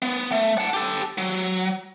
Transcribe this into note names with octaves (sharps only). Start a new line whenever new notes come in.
B3
A3
F#5 A5
G4 A4
F#3